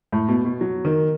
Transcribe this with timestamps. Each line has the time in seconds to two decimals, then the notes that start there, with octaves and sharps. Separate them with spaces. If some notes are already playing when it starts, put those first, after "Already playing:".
0.12 A2
0.28 B2
0.45 B2
0.61 F#3
0.85 D#3